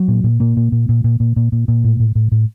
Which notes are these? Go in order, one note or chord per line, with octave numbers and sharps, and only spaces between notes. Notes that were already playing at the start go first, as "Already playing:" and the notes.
Already playing: F#3
A#2
A#2
A#2 A#3
A#2
A#2
A#2
A#2
A#2
A#2
A#2
A#2
A2
A2
A2
A2